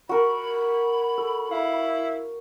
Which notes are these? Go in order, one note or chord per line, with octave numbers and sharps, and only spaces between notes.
F#4 A#4 B5
A4
E4 F5